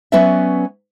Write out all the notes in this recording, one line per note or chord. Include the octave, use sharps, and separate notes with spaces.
F#3 B3 C#4 B4 D5 E5